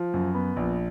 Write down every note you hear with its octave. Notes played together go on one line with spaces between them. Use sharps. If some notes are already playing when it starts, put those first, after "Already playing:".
Already playing: F3
F#2
B3
A#1